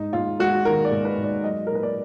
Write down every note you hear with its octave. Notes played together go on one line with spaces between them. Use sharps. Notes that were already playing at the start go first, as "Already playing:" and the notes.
Already playing: G#2 D#4
G#2 F4
G#3 F#4
D#3 A#4
D5
G#2
B4
G#2
D5
F#3 D#5
A#2 A#4
B4
D5